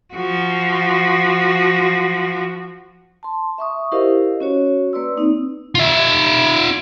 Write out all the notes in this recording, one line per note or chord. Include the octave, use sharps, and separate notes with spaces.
F3 F#4
A5 C6
E5 C#6 D#6
E4 G4 A#4 C5 D#5 F5
C#4 F#4 C#5
A#3 B4 D5 C6 E6
C4 D#4
F4 E5